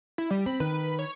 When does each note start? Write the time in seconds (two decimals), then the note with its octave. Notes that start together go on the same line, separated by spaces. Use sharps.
0.18 E4
0.30 G3
0.46 C4 B5
0.60 D#3 B4
0.99 C#5